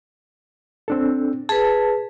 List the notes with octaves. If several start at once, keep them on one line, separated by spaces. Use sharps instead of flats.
C4 D4 A4
G#4 B4 A5